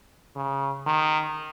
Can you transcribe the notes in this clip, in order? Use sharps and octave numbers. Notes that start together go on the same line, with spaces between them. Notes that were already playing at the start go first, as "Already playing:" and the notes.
C#3
D#3